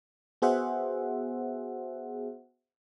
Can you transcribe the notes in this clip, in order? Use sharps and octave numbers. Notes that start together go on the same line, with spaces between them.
B3 F#4 G#4 C5 E5 F#5